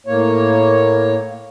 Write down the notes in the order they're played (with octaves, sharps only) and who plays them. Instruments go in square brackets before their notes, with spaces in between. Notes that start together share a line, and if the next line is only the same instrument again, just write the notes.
[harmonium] A2 A#3 C#5